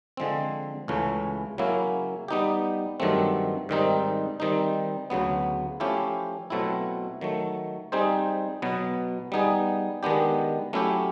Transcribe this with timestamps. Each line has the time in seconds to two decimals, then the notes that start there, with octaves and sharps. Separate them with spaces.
0.17 D3 F3 G#3 C4
0.88 C#2 C#3 E3 A3 C#4
1.58 C#3 F#3 A#3 C#4 E4
2.28 G3 B3 D#4 G4
3.00 G2 D#3 F#3 A3 C4
3.69 G#2 D#3 G3 C4 D#4
4.40 D#3 G3 C4 D#4
5.10 D2 C#3 F#3 B3
5.80 F3 A3 C#4 E4 G4
6.50 B2 F#3 A3 C4 E4
7.21 D#3 F#3 A3
7.92 G3 C4 D#4 G#4 C5
8.62 B2 F#3 B3
9.32 G3 B3 D#4 G#4
10.03 D#3 G#3 B3 D4 G4
10.73 F#3 A3 C#4 E4 G4